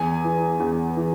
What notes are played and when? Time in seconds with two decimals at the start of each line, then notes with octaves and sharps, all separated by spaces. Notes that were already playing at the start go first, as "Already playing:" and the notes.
Already playing: E2 G#5
0.24 E3
0.60 E2
0.97 E3